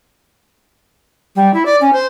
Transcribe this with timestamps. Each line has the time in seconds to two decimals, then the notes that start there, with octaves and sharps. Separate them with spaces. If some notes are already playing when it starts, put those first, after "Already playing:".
1.36 G3
1.54 E4
1.66 D5
1.81 C#4
1.93 C5